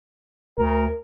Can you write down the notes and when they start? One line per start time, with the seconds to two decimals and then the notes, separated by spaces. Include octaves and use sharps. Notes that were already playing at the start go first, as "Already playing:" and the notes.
0.58 D2 A#4